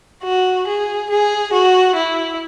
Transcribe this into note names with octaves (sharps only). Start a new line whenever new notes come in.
F#4
G#4
G#4
F#4
E4